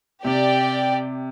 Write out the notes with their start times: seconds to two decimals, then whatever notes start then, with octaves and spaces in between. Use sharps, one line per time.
0.25 C3 G4 D5 G5